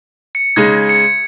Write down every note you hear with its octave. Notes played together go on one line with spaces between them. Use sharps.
C#7
C#3 G#3 D#4 G#6
C#7